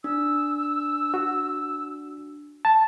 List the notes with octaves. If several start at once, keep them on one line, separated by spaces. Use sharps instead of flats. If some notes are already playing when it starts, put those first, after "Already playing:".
D4 E6
F#4
A5